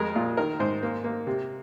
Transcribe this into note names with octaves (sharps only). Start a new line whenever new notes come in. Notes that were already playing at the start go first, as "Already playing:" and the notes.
Already playing: F2 G#3 A#4
A#2 F4
D#3 A#4
G#2 C5
A#3
A#3
C3